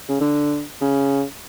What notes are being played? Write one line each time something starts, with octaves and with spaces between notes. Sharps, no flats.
C#3
D3
C#3